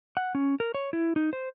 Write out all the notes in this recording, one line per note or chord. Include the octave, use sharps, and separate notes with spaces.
F#5
C#4
A#4
C#5
E4
D#4
C5